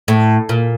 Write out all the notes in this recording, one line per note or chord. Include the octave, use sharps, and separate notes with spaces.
A2
A#2